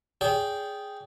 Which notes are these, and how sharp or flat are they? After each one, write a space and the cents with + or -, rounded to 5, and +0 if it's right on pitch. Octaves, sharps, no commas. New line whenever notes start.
G#4 +0 D5 -45 G5 +0